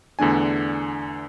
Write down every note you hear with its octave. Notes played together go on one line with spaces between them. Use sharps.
E2 D3 A3 D4 G#5